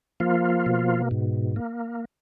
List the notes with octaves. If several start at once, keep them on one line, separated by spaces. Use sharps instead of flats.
F3 A#3 F4
B2
G#2
A#3